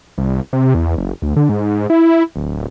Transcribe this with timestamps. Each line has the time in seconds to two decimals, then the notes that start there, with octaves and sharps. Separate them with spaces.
0.18 C2
0.53 C3
0.75 E2
0.97 F#1
1.22 D2
1.36 D3
1.49 G#2
1.90 E4
2.36 D1